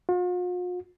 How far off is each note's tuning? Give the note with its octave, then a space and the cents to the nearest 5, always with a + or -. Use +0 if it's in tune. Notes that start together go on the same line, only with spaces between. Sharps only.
F4 +45